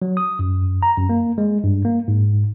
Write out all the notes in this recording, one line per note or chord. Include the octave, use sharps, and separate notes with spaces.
F#3
D#6
F#2
A#5
F#2
A#3
G#3
G2
A#3
G#2